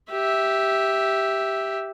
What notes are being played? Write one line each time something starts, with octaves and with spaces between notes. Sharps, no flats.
G4 E5